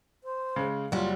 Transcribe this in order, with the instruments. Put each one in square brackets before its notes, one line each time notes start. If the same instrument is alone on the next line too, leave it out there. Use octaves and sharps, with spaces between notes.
[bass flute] C5
[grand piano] C#3 G#3
[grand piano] F#1 [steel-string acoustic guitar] F#3 G3 [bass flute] F4